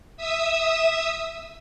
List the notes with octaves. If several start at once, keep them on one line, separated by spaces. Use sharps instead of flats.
E5 D#6 E6